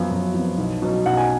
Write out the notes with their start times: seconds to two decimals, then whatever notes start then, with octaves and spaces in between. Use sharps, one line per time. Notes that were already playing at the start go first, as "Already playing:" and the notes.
Already playing: F#2 F3 B3
0.11 F#2
0.34 F3 B3
0.58 B1
0.82 B2 F#3 C#4
1.06 B1 F#5
1.17 G#5